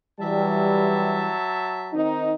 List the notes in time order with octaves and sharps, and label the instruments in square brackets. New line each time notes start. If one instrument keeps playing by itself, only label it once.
[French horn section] E3 G3 [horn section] F#3 E5 A5
[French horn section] D#3 C4 D#4